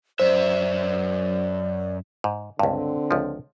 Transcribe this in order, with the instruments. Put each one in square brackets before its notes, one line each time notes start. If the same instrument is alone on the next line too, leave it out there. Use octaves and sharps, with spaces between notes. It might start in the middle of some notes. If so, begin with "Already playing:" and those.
[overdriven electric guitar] F#2 E5 [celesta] C5 [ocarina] D5
[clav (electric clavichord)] G#2
[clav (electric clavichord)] C#2 G2 [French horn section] D3 C4
[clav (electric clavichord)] C#2 F3